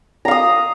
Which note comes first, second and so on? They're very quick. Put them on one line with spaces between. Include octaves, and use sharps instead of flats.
A#5 F5 D#6